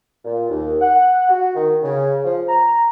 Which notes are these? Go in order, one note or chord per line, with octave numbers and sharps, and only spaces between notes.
A#2
D#2
F#5
F#4
D#3
C#3
F3
A#5